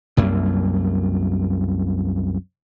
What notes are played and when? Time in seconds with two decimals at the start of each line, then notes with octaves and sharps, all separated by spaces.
0.17 C2 F#2 A#3